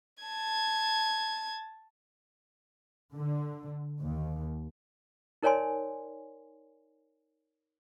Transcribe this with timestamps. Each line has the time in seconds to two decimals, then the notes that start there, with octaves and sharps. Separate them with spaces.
0.23 A5 G#6
3.14 D3
3.99 D#2
5.43 D#4 A#4 C#5 D5 G#5 C6